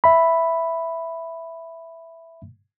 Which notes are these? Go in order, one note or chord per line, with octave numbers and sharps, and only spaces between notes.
E5 B5